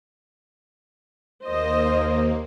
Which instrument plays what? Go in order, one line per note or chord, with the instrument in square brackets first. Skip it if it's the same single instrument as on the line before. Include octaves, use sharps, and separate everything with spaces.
[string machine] D#2 A#3 [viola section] C5 D#5